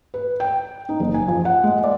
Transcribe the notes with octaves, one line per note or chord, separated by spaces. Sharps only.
B4
G5
D#4
F#1
G#5
F3
F#5
G#3
D5